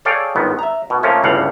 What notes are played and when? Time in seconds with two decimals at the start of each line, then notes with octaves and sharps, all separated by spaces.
0.05 G#4 A4 C#5 D5 F5 G5
0.36 G1 G#2 D#3 B3
0.59 E5 A#5
0.90 B2
1.03 C3 F3 A3 A#3 C#4
1.24 G1 C#2 A2 G3 F5 F#5